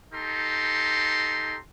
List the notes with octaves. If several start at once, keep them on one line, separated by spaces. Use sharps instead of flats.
D#4 G4 A4 A#5 C6